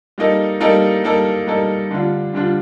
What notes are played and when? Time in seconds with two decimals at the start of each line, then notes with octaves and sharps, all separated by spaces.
0.18 G3 A#3 D#4 A4
0.60 G3 A#3 D#4 A4
1.04 G3 A#3 D#4 A4
1.47 G3 A#3 D#4 A4
1.91 D3 G3 D4 F4
2.33 D3 G3 D4 F4